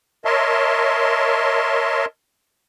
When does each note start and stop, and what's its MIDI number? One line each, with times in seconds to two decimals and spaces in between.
0.25 2.05 70
0.25 2.05 73
0.25 2.05 75
0.25 2.05 76
0.25 2.05 81
0.25 2.05 84